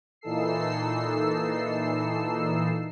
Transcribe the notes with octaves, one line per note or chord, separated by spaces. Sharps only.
A#2 E3 D#4 A4 E6 C7